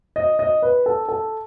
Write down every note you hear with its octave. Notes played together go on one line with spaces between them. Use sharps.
D#5
D#5
B4
A4
A4